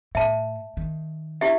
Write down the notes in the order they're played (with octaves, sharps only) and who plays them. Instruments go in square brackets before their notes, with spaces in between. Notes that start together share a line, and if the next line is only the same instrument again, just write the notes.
[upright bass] A2 [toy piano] E5 A5
[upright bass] D#3
[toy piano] E4 G4 E5